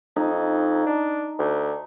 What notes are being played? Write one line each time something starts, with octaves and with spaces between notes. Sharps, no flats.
F2 D#4
D4
D2